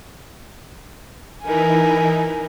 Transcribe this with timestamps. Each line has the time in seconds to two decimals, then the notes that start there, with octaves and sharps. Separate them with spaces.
1.44 E3 D#4 E4 A#4 G#5